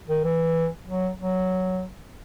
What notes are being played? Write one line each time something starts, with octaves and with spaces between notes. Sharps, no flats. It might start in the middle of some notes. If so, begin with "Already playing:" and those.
D#3
E3
F#3
F#3